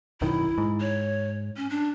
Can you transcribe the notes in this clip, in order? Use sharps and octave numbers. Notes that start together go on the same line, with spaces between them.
B1 F#2 D#3 E4
G#2
C#5
C#4
D4